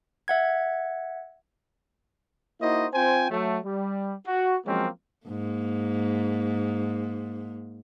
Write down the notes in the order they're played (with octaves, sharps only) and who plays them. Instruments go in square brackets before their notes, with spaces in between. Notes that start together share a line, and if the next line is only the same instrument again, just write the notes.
[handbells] E5 F#5 G#6
[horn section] A#3 D#4 E4 F#4 C5 D#5
C4 F4 C5 G5 G#5
F#3 A3
G3
F#4
F3 F#3 G#3 A#3 C4 C#4
[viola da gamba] G#2 A#3